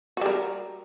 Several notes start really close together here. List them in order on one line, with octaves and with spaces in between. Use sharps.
F#4 G3 A#4